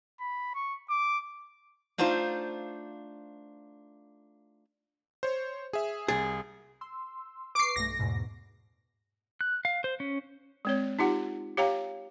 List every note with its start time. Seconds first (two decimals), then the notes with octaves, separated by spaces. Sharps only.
0.20 B5
0.55 C#6
0.90 D6
1.98 A3 D4 D#4 F4 C5 F5
5.23 C5 C#5
5.73 G#4 E5
6.08 C2 G#4 A6
6.81 C6 E6
7.55 B4 C#6 D6 C7
7.76 B1 G2 A3 A#6
7.99 E2 G#2 B2
9.41 F#6
9.65 F5
9.84 C5
10.00 C#4
10.65 G#3 C4 C#5
10.99 D#4 F4 G4 F#5
11.57 G4 C#5 F5 G5 A#5